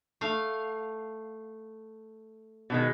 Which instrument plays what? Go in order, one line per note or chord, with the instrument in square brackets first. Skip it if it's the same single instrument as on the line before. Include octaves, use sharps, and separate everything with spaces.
[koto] A3 F5
[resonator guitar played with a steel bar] B2 D#3 G#3